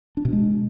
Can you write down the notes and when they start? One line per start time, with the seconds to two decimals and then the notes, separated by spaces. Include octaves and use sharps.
0.17 D4
0.25 B2
0.33 G#3